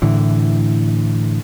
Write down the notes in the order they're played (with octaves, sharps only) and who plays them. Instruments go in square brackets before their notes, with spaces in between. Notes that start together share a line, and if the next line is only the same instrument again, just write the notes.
[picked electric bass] A2 D3 E3